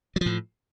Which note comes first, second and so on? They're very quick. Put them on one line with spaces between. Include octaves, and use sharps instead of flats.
F#3 F3 A2